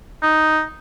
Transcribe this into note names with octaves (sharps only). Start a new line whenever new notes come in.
D#4